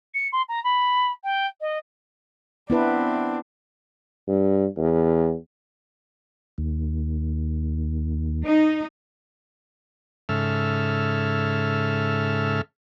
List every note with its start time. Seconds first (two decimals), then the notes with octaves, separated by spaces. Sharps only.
0.15 C#7
0.33 C6
0.49 A#5
0.64 B5
1.24 G5
1.61 D#5
2.70 B3 C4 D4 E4 B4
4.28 G2
4.78 E2
6.58 D#2
8.45 D#4
10.29 G#2 C#3 A4 E5 F6